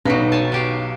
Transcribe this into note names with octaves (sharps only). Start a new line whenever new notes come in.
B1 F#3 G3 D#4 B4
C#5 G#5 A5
F#3 G4 F5